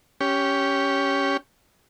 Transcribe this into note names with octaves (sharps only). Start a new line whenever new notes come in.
C#4 G4